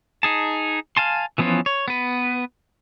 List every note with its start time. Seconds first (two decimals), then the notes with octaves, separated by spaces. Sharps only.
0.23 D#4 G#4 A5
0.97 F5 G#5 A5 C6
1.38 E3 F3 B3 C#4 F4
1.66 C#5
1.88 B3 B4